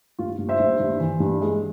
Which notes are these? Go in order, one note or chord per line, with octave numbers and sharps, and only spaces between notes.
G2 F4
G2
C5 E5
G2
G2
E3
G2
G#3